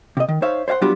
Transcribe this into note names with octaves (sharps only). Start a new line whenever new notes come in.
C3 D#5
D#3
D#4 C5 C#5 E5 F5
C5 C#5 F5 F#5 C6
F#3 G3 B3 D4 F4 G4